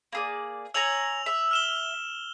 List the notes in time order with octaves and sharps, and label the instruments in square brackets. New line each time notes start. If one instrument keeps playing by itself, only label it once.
[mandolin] A#3 G#4 D5
[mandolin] C#5 G#5 A#5 [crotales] E6 F7 F#7
[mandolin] E5
[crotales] F6 E7 G7